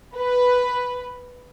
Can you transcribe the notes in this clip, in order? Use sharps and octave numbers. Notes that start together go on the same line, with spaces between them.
B4